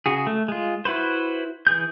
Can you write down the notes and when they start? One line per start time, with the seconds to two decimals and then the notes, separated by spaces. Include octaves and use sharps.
0.06 C#3 F#4 G#4
0.27 A3
0.48 G#3 F4
0.85 E4 F#4 B4 C5
1.67 E3 G#4 G6